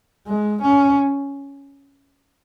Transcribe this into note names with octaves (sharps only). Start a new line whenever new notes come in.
G#3
C#4